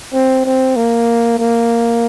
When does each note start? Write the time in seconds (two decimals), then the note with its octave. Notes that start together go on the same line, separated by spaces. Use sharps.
0.13 C4
0.45 C4
0.76 A#3
1.38 A#3